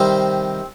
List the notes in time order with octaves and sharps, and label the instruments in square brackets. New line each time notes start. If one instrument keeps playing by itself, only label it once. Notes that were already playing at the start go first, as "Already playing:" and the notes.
Already playing: [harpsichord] C3 D#3 G3 C4 C5